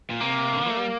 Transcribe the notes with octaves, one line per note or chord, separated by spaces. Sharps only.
A#2
C3 A#3
D3
D#3
A3
G3